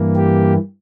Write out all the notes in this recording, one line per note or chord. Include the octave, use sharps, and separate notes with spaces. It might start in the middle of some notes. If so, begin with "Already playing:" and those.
Already playing: G2 E3 A#3
G4